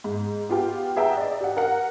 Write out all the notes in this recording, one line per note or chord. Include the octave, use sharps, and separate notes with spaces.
G#2
B3 F4 G4 G5
G#4 B4 E5 F#5 G5 A#5
D5 D#5
G4 F#5
A#4 F#5